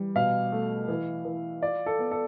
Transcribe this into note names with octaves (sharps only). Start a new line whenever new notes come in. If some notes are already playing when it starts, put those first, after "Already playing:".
Already playing: E3 G3
B2 F5
A3
E3
E3
F4 D5
A4
B3
A4